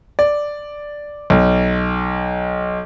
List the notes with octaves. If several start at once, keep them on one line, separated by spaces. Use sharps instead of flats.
D5
B1